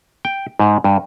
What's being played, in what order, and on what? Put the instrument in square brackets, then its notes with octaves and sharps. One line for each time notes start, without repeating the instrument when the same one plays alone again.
[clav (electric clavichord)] G5
G#2
G2